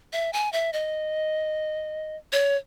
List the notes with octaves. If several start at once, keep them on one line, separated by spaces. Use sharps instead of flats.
E5
G#5
E5
D#5
C#5